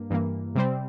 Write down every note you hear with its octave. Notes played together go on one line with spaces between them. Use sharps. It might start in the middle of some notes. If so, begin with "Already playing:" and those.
Already playing: G2 A#3
G2 E3 A#3
C3 G3 C4